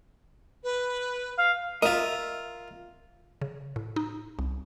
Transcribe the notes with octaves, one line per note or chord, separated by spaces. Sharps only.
B4
F5
F4 A#4 D#5 E5
C#3
A2
D#4
C2